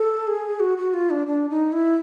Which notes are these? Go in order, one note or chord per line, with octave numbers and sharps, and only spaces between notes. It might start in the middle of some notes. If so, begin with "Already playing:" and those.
Already playing: A4
G#4
F#4
F#4
F4
D4
D4
D#4
E4